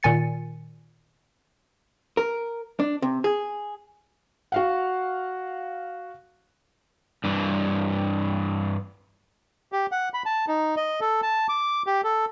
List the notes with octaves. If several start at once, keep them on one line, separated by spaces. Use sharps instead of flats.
A#2 D#3 G#5 A6 C#7
A#4
D4
C3
G#4
F#4 F5 F#5
G2 E3
G4
F#5
B5
A5
D#4
D#5
A4
A5
D6
G4
A4